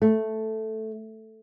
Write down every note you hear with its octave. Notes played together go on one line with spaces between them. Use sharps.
A3